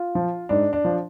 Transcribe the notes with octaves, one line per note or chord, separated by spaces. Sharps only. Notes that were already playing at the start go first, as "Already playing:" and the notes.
Already playing: F4
F3
G#2 D4
D4
F3